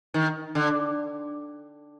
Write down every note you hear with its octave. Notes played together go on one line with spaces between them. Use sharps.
D#3
D3